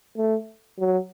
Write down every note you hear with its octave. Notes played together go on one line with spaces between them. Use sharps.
A3
F#3